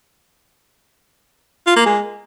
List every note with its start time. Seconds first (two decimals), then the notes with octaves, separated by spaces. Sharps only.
1.67 F4
1.76 A#3
1.86 G#3